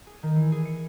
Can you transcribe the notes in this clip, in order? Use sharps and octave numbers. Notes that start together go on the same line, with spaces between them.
G#4
D#3
E3
G#4
C#7